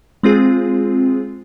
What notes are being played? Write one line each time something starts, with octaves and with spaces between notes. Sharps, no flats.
G#3 C4 F4 G#4